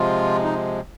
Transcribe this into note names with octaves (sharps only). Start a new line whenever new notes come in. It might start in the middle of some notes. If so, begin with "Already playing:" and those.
Already playing: C3 F3 G#3 F4
D#4